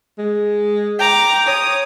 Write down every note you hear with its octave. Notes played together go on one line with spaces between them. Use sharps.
G#3
G5 A#5 D6
C#5 D#6